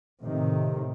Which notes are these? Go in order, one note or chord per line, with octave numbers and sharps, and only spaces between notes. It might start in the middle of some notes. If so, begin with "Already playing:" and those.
A2 C3 D#3